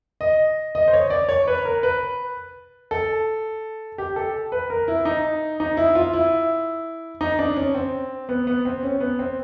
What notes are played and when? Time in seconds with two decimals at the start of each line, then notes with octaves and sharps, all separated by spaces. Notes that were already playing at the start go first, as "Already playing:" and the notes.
0.21 D#5
0.75 D#5
0.88 C5
0.93 C#5
1.10 D5
1.29 C#5
1.47 B4
1.65 A#4
1.83 B4
2.91 A4
3.98 G4
4.16 A4
4.52 B4
4.70 A#4
4.88 E4
5.05 D#4
5.60 D#4
5.77 E4
5.95 F4
6.13 E4
7.21 D#4
7.39 D4
7.57 C#4
7.75 C4
8.29 B3
8.47 B3
8.65 C4
8.83 C#4
9.00 B3
9.19 C4